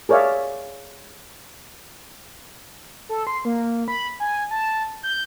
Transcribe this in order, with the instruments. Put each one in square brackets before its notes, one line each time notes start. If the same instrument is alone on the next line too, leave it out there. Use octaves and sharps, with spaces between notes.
[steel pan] G#4 A#4 C#5 D5 E5 F5
[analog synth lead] A4
C6
A#3
B5
G#5
A5
G6